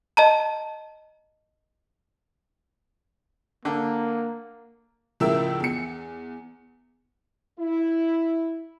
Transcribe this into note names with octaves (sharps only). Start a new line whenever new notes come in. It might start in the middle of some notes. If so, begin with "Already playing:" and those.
D#5 A5 A#5
D3 A#3
C#2 A2 F3 A#4 E5 E6
E2 C#7
E4